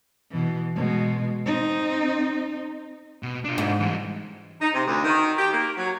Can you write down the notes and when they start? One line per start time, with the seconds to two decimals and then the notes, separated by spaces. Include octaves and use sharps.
0.31 B2 E3
0.75 B2 G#3
1.46 C4 D#4
3.23 B2
3.45 D4 F4
3.58 G#2
3.80 E3 G3
4.60 D#4
4.74 C3
4.87 D2
5.04 D#3
5.37 G4
5.52 A#3
5.77 F#3